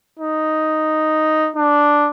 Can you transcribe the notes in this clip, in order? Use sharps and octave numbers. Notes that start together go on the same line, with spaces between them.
D#4
D4